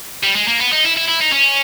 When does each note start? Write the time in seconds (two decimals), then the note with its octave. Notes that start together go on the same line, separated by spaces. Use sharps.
0.23 G3
0.36 G#3
0.48 A#3
0.60 B3
0.72 D#4
0.85 E4
0.96 E4
1.08 E4
1.20 D#4
1.32 C#4